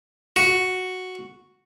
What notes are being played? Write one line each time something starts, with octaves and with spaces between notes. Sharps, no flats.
F#4